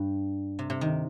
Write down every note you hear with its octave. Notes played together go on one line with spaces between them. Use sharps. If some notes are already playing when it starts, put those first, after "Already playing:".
Already playing: G2 G3
C3
C3
D#3